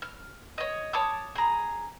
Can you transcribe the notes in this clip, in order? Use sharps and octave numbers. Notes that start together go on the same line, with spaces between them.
F6
C#5 D#5
C#5 A5 D6 D#6
G#4 A#5